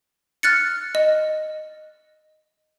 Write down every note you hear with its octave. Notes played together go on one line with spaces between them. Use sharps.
F6 F#6 A6 C#7
D#5